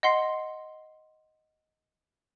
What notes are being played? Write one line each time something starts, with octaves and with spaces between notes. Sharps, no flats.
D#5 F#5 C6 C7